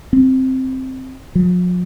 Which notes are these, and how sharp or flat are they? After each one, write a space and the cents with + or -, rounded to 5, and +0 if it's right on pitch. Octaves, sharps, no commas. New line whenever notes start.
C4 +0
F3 +45